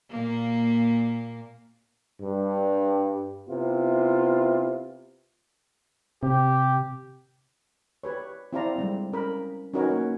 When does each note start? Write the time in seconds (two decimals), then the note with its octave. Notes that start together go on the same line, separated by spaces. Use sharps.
0.10 A#2 A#3
2.21 G2
3.48 C3 B3 E4 F4
6.23 C3 G4
8.04 G4 B4 C#5
8.53 C4 E4 G4 D5 F5 A#5
8.76 G3 G#3 C4
9.12 C#4 A#4 B5
9.74 C#4 D#4 F#4 A#4 B4 C#5
9.90 A#3 C#5